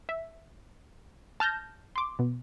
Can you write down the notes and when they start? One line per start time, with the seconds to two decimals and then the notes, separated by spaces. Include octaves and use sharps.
0.09 E5
1.40 A5 F6 G6 A#6
1.96 C6 D6
2.19 B2